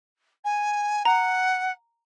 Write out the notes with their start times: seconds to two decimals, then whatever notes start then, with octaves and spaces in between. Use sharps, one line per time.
0.44 G#5
1.05 F#5 A#5